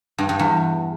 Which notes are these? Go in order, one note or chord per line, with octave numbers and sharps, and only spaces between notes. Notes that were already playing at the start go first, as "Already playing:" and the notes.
G2
G2
E2